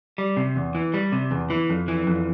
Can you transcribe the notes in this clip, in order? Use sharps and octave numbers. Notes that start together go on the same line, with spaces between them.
G3
C3
E2
E3
G3
C3
E2
E3
F2
E3
F2